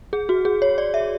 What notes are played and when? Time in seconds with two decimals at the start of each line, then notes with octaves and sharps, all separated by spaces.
0.13 G#4
0.29 F#4
0.45 G#4
0.62 C#5
0.78 D5
0.94 E5